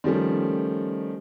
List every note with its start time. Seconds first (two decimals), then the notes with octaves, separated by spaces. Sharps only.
0.04 D#3 F3 G3 A3 C#4